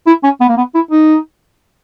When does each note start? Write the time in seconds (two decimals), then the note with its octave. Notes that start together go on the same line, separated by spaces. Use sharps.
0.07 E4
0.24 C#4
0.41 B3
0.49 A#3
0.57 B3
0.75 E4
0.91 D#4